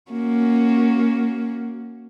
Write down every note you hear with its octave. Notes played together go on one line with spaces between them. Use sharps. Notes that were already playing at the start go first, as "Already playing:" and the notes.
A#3 C#4 F#4